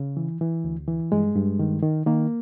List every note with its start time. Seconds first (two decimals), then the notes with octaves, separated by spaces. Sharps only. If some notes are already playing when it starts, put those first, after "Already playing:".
Already playing: C#3
0.17 E3
0.41 E3
0.64 D2
0.88 E3
1.12 G2 G#3
1.35 G2
1.59 D#3
1.83 D#3
2.06 D#3 A#3